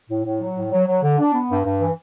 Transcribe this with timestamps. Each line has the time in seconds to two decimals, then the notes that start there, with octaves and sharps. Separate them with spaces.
0.09 A2
0.24 A2
0.41 F#3
0.55 A2
0.71 F#3
0.87 F#3
1.03 D3
1.19 D4
1.33 B3
1.50 G2
1.64 G2
1.80 E3